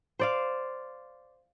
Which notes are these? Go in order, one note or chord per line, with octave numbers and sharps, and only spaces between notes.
C5 D5 F5